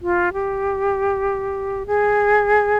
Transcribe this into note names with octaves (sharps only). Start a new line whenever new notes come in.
F4
G4
G#4